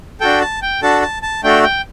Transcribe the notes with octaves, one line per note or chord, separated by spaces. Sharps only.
D4 F#4 A4 G5
A5
G5
D4 F#4 A4 A5
A5
A5
A3 D4 F#4 A4 G5
G5